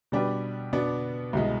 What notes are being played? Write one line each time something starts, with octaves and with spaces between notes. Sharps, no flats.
B2 G3 D4 G4 B4
B2 B3 D4
C2 B2 G#3